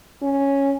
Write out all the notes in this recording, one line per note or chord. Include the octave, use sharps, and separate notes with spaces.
C#4